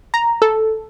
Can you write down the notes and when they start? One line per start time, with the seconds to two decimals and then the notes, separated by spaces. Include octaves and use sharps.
0.14 A#5
0.42 A4